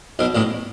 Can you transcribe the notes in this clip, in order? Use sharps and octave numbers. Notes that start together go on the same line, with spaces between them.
B1 B2
A1 A2